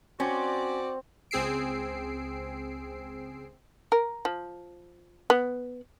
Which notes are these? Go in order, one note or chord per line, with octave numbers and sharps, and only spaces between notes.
C4 C#4 F#4 D5
C#2 C4 G#4 E6 C7 D7
A#4
F3
B3